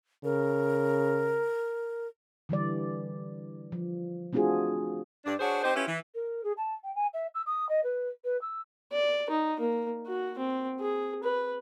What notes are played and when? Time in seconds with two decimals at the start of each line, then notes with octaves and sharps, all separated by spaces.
0.24 C#3 A#4
2.49 D3 E3 G3 D5
3.72 F3
4.33 A3 C4 D4 F4 F#4 G#4
5.25 G2 D4
5.39 D4 F#4 G#4 C5 C#5
5.63 C4 D#4 G4 C5
5.75 C#4 E4 F4 G4 B4
5.88 E3
6.15 A#4
6.44 G#4
6.57 A5
6.84 G5
6.95 G#5
7.14 E5
7.35 E6
7.46 D#6
7.69 D#5
7.84 B4
8.24 B4
8.41 E6
8.92 D5
9.30 D#4
9.60 A#3
10.07 F#4
10.39 C4
10.80 G#4
11.24 B4